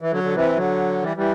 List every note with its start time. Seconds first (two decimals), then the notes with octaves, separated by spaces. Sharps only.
0.02 E3
0.11 D3 F#3
0.23 D3
0.34 C3 E3
0.56 D3 F#3
1.02 E3 G3
1.17 E3 G3